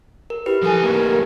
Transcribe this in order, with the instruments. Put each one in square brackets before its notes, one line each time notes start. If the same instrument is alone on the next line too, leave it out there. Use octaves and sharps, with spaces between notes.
[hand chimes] A#4
[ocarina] E4 [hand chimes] G4 B4
[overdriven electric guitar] F3 G#5 [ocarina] A4
[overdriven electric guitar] D#2 A2 [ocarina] A#4